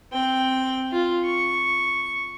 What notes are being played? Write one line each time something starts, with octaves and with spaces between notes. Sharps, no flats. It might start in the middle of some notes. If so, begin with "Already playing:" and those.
C4 G5
F4
C#6